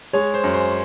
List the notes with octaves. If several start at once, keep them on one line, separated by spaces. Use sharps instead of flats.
G#3 C#5
C5
F#2
C5